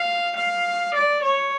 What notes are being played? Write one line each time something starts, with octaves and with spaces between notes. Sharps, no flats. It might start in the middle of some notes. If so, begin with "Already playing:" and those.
Already playing: F5
F5
D5
C#5